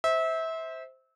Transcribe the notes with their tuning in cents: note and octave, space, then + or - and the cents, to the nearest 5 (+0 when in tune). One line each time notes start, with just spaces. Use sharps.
C5 +0 E5 -25